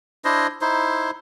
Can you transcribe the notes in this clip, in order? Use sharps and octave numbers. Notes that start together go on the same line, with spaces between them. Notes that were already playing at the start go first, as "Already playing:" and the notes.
D4 E4 C5 D#5
D#4 E4 C5